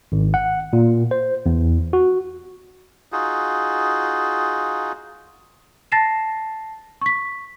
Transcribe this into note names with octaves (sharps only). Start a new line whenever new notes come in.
G#1
F#5
A#2
C5
E2
F#4
D#4 F4 F#4 G#4
A5 A6 A#6 C7 E7
C#6 B6